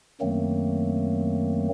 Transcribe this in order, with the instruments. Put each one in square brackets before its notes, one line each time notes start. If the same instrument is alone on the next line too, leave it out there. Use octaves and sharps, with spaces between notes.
[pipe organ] F#2 D#3 F#3 A3 A#3 C4